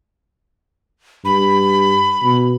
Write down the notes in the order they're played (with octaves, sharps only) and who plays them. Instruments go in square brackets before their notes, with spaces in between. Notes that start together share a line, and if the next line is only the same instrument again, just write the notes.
[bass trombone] G2 [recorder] B5
[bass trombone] B2